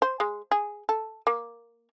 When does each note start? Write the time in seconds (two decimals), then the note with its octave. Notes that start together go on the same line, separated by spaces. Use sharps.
0.02 C5
0.20 G#3
0.51 G#4
0.89 A4
1.27 A#3